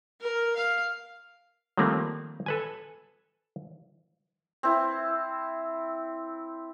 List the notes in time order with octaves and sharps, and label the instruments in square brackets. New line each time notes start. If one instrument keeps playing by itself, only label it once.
[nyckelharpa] A#4
F5
[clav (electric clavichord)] D#3 F3 G3 A3 A#3 C4
A4 B4 G#5
[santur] C4 E4